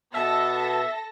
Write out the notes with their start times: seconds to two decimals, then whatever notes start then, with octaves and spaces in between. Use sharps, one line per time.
0.14 B2 B3 A4 E5 A5 A#6